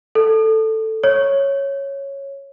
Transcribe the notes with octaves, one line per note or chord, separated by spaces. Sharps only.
A4
C#5